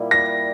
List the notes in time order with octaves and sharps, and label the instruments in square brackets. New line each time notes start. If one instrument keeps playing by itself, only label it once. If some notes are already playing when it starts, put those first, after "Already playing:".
Already playing: [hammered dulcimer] A#2 G3 A#3 E4
[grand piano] A#6